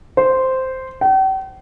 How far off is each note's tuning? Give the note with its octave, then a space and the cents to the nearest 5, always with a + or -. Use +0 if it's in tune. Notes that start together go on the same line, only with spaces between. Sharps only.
C5 -5
G5 -45